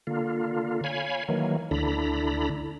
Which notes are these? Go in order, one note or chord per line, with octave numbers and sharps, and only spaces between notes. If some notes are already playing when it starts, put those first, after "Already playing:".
D3 A#3 F4
C#5 F5 G#5 B5
D#3 E3 F#3 A#3
D2 D3 D4 E4 A#5 B5